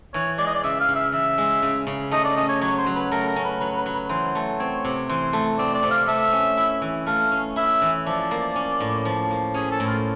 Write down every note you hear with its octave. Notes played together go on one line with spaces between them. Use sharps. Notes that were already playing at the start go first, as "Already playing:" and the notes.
E3 C#5
G#3 D5
D#5
D5
C#3 E5
F5
C#3
E5
E3 E5
G#3
C#3
C#3
A3 D#5
D5
C#4 D#5
C#5
F#3 C#5
C5
F#3
B4
A3 A#4
A#4
C#4
B4
F#3 B4
B4
F#3
B4
E3 C5
A3
C4 C#5
C3
E3 C5
A3
C4 D5
D5
C3
F5
A3 E5
C#4
E4
E3
A3 F5
C#4
E4 E5
E3
F3 D5
A#3
C#4
A2
F3
A#3
C#4 G#4
A4
A2
F4